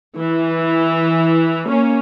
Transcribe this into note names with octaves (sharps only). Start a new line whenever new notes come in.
E3
A#3 C#4